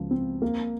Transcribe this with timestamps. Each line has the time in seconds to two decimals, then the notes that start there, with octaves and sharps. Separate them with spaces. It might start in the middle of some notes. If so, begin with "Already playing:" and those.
Already playing: C#2 F3
0.11 C4
0.42 A#3